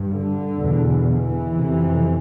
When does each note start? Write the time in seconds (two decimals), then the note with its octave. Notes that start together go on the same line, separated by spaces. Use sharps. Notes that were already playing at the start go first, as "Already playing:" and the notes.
Already playing: G2
0.12 D3
0.58 E2 B2
1.06 E3
1.53 F2 C3